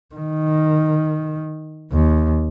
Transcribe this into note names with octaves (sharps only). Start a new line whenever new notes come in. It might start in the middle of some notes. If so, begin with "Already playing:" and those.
D#3
D#2